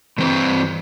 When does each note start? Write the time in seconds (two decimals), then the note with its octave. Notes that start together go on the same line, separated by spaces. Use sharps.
0.18 G2 E3 C4 C5